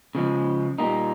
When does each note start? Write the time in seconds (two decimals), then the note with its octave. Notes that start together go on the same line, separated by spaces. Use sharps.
0.15 C#3 F3 G#3
0.78 A#2 G3 A#3 D#4